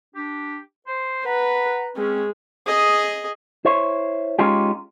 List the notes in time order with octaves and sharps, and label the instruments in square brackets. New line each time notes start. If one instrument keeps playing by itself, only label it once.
[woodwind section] D4 G4
C5
[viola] B4 [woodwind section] F#5 A#5 B5
[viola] G#3 [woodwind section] C4 C#4
[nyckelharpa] G#4 D#5
[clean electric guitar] E4 C5 C#5
G#3 C#4 D#4 F4 G4